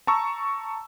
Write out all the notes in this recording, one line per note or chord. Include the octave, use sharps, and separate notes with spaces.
A5 A#5 C#6 E6